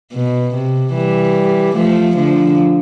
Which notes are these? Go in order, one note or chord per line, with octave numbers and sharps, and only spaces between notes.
B2
C3
E3 G3
F3 A3
D3 F3